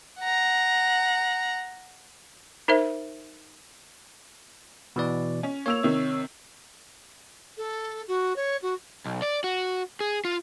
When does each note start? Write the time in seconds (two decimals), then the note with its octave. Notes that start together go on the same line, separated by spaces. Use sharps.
0.19 F#5 A#5
2.68 D#4 A#4 C5 E5
4.96 B2 E3 D5
5.43 C#4
5.66 A#3 C#5 E6 F7
5.83 C3 D#3
7.57 A4
8.08 F#4
8.36 C#5
8.62 F#4
9.06 B1
9.22 D5
9.44 F#4
10.01 G#4
10.25 F4